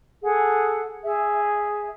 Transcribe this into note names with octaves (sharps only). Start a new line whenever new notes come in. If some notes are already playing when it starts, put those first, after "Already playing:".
G#4 A4 F#5
G#4 E5